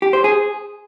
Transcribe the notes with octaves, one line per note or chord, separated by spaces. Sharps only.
G4
C5
G#4